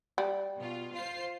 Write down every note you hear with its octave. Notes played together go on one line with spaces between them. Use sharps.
G3
B2 F4
F4 C5 C7